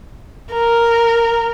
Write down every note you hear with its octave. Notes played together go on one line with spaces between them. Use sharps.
A#4